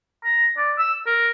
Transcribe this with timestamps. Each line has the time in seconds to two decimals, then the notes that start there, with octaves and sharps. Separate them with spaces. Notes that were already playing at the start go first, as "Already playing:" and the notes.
0.24 A#5
0.57 D5
0.79 E6
1.07 A#4